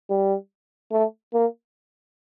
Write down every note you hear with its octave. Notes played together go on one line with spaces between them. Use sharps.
G3
A3
A#3